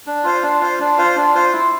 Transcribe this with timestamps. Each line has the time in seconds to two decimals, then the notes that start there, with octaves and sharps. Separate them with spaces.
0.07 D4
0.24 F4 C5 F5
0.43 D4
0.61 F4 C5 F5
0.80 D4
0.98 F4 C5 F5
1.16 D4
1.35 F4 C5 F5
1.53 E4